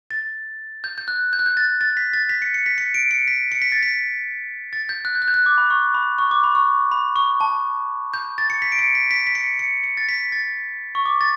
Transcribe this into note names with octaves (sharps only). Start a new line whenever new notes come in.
A6
G6
G6
F#6
G6
F#6
G6
A6
A6
B6
A6
B6
C#7
C#7
B6
C#7
D7
C#7
B6
C#7
B6
A6
B6
A6
G6
F#6
G6
F#6
G6
F#6
D6
B5
C#6
B5
C#6
D6
B5
C#6
B5
C#6
A5
G6
A6
C#7
B6
D7
C#7
B6
B6
B6
C#7
C#7
C#7
A6
B6
A6
C#6
D6
A6